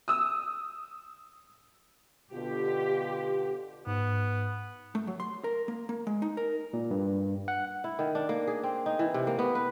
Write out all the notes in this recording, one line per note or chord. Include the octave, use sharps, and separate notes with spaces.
D#6 E6
B2 D3 F4 G4
G#2 B3
A3
F#3
C6
A#4
A#3
A#3
G#3
D#4
A#4
A#2
G2
F#5
E4
D#3
D4
A#3
G#4
C4
D#4
E3
C3
A#3
B3
B4